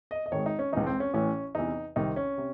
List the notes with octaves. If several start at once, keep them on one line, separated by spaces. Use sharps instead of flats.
D#5
D#5
G#1 G#2 D#3 C#5
D#4
C#4
C#2 C#3 E3 D#4
C4
C#4
A1 A2 E3 C#4
E2 C3 E3 D#4
C2 C3 D#3 D#4
C#4
C3